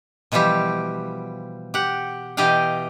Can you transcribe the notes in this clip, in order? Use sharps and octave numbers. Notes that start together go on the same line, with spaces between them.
B2 E3 F3 G3 G4
G4 F#5
B2 E3 G4 D#5 F5 G5